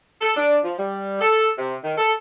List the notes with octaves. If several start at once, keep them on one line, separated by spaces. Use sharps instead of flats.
A4
D4
F3
G3
A4
C3
D#3
A4